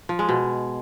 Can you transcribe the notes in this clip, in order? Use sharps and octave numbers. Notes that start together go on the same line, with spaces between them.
F3
G#3
B2